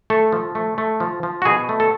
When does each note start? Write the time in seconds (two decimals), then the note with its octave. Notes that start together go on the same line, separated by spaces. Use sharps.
0.10 A3 A4
0.32 F3
0.55 A3
0.78 A3
1.00 F3
1.23 F3
1.42 F#4
1.45 B2 G#4
1.69 A3
1.80 A4